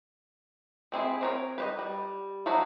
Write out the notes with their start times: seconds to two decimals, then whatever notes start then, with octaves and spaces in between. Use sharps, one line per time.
0.92 G#3 C4 E4 G#4
1.21 C4 A#4 C#5
1.58 B4 C5 D#5
1.79 G3
2.46 F3 F#3 D#4 E4 F#4